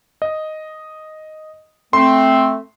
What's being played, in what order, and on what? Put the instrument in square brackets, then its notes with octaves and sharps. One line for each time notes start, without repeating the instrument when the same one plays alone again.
[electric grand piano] D#5
[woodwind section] A3 C4 [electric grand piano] C6